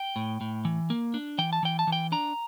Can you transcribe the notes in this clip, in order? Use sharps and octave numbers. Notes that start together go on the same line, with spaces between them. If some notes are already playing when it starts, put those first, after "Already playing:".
Already playing: G5
A2
A2
E3
A#3
D4
E3 G5
A5
E3 G5
A5
E3
G5
D4 A#5